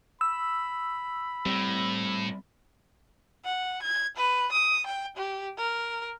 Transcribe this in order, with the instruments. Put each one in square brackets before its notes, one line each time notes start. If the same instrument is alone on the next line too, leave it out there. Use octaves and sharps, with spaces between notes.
[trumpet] B5 [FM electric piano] E6
[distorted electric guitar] A2 [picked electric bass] G3 C4
[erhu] F#5
G#6
B4
D#6
G5
G4
A#4